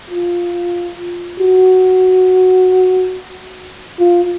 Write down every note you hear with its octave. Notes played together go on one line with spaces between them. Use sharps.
F4
F#4
F4